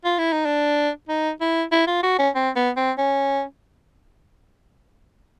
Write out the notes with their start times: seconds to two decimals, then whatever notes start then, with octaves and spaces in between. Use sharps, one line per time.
0.05 F4
0.18 E4
0.33 D#4
0.46 D4
1.09 D#4
1.41 E4
1.72 E4
1.87 F4
2.03 F#4
2.19 C#4
2.35 C4
2.56 B3
2.77 C4
2.98 C#4